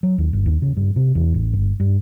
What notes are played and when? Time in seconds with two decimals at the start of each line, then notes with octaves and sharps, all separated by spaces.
0.03 F#3
0.18 D#2
0.33 G1
0.46 D#2
0.62 C#3
0.77 G2
0.96 C3
1.15 E2
1.34 A1
1.53 G1
1.80 G2